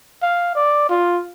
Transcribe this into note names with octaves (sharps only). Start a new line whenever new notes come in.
F5
D5
F4